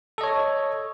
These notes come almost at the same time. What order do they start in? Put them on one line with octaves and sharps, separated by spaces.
A4 D#5 C#5